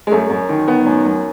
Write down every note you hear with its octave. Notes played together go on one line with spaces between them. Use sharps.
G#3
F#2 A3
F#2
D#3
D#3 B3
F#2
F#2